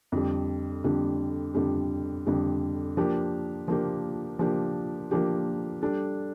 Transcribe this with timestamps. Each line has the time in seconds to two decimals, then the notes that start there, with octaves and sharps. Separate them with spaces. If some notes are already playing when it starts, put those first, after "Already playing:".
0.12 F2 D3 G3
0.84 F2 D3 G3
1.54 F2 D3 G3
2.26 F2 D3 G3
2.97 F3 A#3 D4 G4
3.68 F3 A#3 D4 G4
4.39 F3 A#3 D4 G4
5.11 F3 A#3 D4 G4
5.82 G3 D4 A4